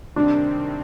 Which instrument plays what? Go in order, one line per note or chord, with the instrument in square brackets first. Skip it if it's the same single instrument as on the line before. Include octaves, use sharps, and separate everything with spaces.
[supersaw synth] C3 D#3 G3 C4 [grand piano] D4